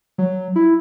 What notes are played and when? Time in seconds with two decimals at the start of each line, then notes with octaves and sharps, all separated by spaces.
0.18 F#3
0.56 E4